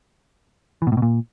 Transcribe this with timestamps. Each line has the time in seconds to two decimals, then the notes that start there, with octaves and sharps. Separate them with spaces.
0.82 E3
0.87 B2
0.92 A2
0.97 B2
1.02 A#2